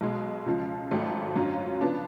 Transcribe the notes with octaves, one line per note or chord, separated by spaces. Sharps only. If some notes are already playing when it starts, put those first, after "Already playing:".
B1 B2 G#3
C#2 C#3 F3
G#1 G#2 F#3 A3
F#2 D3 F#3 C#4 F4
C#3 F3 B3 D4